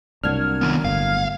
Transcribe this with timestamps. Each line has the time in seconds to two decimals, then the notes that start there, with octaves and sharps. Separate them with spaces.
0.24 C2 F#3 A#3 D4 F6 G#6
0.61 D#3 B3
0.85 G1 A2 F5